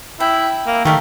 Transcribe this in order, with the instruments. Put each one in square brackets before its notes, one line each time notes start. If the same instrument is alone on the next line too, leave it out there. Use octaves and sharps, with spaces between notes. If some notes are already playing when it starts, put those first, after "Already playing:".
[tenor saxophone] E4 [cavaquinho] G5
[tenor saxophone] A#3
[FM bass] D#3 [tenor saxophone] A3 [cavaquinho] G4 A#4 F5